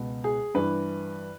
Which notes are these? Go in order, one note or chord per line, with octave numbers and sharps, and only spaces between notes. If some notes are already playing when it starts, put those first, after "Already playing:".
Already playing: C#2 B2
G#4
G2 E3 B4